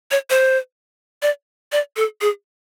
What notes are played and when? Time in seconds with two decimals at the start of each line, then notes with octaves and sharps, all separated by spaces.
0.11 C#5
0.30 C5
1.22 D5
1.72 D5
1.97 A4
2.21 G#4